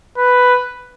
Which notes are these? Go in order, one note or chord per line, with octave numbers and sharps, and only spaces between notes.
B4